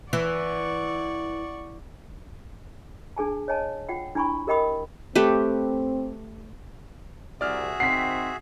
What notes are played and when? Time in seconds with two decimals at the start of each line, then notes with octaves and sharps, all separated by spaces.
0.13 E3 D5 F#5 C#6
3.16 D4 G#4 G#5 A5
3.48 C#5 D#5 G#5 A5
3.89 F4 F#5 G5
4.15 D4 E4 G#5 B5 C#6
4.47 G4 A#4 D#5 G5 B5 D#6
5.15 A3 C4 G4 B4
7.41 C2 F#4 G#4 D5 E5 F6
7.80 D#3 C4 F#5 B6 C7